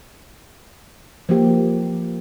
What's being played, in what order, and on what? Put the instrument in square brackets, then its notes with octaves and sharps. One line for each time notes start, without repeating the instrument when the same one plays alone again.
[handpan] F3 A#3 G4